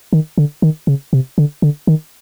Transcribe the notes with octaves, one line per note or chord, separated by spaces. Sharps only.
D#3
D3
D#3
C#3
C3
D3
D3
D#3